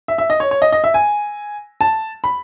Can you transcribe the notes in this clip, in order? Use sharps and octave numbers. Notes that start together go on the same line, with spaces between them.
E5
E5
D#5
C#5
C#5
D#5
D#5
E5
G#5
A5
B5